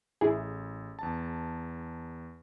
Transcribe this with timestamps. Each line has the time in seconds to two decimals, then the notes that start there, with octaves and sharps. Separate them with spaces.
0.21 A1 E4 G#4
0.99 E2 A5